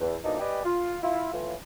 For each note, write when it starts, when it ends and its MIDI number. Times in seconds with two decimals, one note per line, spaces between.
0.01 0.16 40
0.24 0.39 41
0.24 0.39 47
0.24 0.39 52
0.24 0.39 58
0.24 0.39 62
0.24 0.39 63
0.40 0.61 67
0.40 0.61 71
0.40 0.61 74
0.40 0.61 75
0.40 0.61 79
0.40 0.61 80
0.65 0.98 65
1.03 1.30 64
1.03 1.30 65
1.33 1.53 45
1.33 1.53 52
1.33 1.53 65